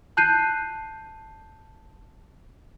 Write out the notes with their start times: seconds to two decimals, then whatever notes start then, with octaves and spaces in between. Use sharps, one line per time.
0.17 A5 F#6 G6 C7 D#7